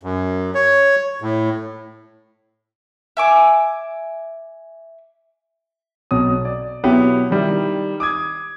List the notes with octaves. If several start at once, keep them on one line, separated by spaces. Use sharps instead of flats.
F#2
C#5
A2
E5 G#5 D6
B1 B2 F#3 D#6
D5
B2 F#3 B3 E4 G4
D#3 G3 E4
D6 D#6 G#6